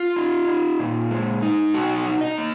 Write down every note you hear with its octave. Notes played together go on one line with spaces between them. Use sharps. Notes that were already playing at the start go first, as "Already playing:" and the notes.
Already playing: F4
D#4
D#4
A#2
G#3
D#4
B2 F#4
D#4
D#5
A#3